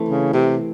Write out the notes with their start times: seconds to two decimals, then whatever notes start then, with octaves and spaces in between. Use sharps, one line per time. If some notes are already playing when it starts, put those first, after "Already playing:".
Already playing: E3 A3 C4
0.09 C#3
0.34 C3